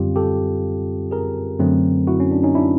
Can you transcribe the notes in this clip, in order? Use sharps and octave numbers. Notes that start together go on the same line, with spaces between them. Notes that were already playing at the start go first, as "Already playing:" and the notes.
Already playing: F#2 D3 G3 C4 F4 G4
G4 A4
G#4 A#4
F#2 D3 F#3 A3 C4
E4 F#4
C#4
D4
C#4 D#4
D4 E4